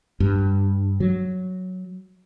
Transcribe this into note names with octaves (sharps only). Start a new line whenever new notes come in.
G2
F#3